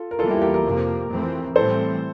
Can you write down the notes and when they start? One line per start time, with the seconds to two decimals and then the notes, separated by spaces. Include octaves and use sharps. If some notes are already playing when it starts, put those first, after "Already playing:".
Already playing: F4 A4
0.11 A#4
0.19 E2 E3 G3 A#3 F4 A4
0.31 E4 G4
0.42 G4 A#4
0.54 G4 A#4
0.65 F2 C3 F3 A#3
1.11 F2 E3 A3 C4
1.56 A2 E3 G3 C4 A4 C5